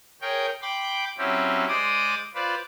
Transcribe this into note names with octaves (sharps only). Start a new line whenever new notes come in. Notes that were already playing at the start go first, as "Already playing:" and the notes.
G#4 A#4 C#5 G5
G5 B5 C6 D6
F#3 C4 C#4 E4 G4
G#3 C5 D5 D6 D#6
F4 B4 C5 D5